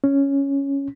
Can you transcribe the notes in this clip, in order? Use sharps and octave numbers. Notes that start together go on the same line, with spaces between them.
C#4